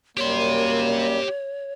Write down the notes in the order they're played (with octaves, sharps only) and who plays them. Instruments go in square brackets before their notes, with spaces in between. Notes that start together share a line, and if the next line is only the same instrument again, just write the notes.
[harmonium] F#2 G3 [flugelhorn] A#3 [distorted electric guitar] G4 C6 [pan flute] C#5